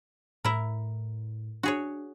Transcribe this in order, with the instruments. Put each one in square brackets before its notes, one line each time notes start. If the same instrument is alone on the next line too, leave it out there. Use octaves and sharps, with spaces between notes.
[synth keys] A2 [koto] E4 A#4
[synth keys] D4 [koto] F#4 G#4 C#5